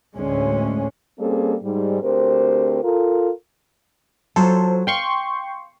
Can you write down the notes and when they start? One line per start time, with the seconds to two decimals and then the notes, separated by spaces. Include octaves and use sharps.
0.15 D2 A2 G#3 C#4
1.19 G3 A#3 C4 C#4 G#4 A4
1.62 G#2 G3
2.02 D2 C4 G4 A#4 C5
2.83 F4 A4 A#4
4.36 F#3 F4 A4 C5
4.87 F5 G5 C6 C#6